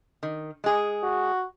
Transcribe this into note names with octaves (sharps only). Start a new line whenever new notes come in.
D#3
G#3 G#4
F#4